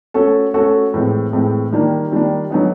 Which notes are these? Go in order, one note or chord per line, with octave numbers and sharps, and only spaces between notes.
A3 C#4 F#4 A4
A3 C#4 F#4 A4
A2 E3 G#3 C4
A2 E3 G#3 C4
D#3 G3 A#3 D4
D#3 G3 A#3 D4
D3 F#3 B3 D#4